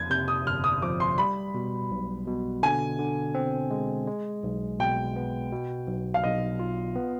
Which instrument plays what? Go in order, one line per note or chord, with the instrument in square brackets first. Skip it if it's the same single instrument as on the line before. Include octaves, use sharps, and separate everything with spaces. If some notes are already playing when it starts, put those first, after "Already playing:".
Already playing: [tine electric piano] F2 [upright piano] G#6
[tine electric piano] C3 [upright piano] G6
[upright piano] D#6
[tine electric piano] G1 [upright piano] F6
[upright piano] D#6
[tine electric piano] F3 [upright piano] D6
[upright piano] C6
[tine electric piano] G3 [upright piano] B5
[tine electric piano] B2
B1
B2
[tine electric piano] D3 [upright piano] G#5
[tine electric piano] D3
C4
G#3
G#3
B1
[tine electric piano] B2 [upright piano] G5
[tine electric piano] B3
B2
B1
[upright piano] F5
[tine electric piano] B1 [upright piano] D#5
[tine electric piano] F4
B3